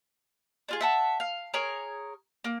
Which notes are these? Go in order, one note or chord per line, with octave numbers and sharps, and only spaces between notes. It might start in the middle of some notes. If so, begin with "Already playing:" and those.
D4 F4 G#4
E5 F#5 A5
F5
G#4 A#4 C#5
A#3